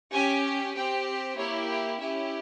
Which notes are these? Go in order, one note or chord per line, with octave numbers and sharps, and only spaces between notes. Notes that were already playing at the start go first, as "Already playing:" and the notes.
C#4 G4 G#5
C4 G4 G5
A#3 E4 G4 C#5
G5
C#4 E4 G4 E5